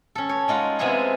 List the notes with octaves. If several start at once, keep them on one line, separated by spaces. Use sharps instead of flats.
C#4 A4
C#5
G#3 D#4 F4 F#5
C3 G#3 B3 E4 F4 G#4